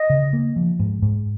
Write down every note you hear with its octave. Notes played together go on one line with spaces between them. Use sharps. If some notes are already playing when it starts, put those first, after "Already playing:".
Already playing: D#5
C#3
A#3
F3
G#2
G#2